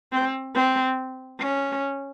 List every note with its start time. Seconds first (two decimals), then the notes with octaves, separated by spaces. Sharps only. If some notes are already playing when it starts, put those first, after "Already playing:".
0.12 C4
0.55 C4
1.40 C#4